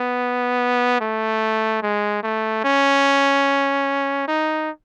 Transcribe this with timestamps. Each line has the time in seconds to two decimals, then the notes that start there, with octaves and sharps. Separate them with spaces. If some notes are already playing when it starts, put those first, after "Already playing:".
Already playing: B3
1.01 A3
1.83 G#3
2.23 A3
2.64 C#4
4.28 D#4